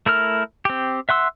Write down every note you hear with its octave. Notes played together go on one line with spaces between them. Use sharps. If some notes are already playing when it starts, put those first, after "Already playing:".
A3 E4 A#4 F6
C4 G4
E5 F#5 C6 E6